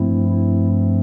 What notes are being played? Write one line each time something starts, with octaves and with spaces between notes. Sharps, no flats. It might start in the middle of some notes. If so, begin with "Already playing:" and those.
Already playing: G2 F3 A3 C4 E4
E4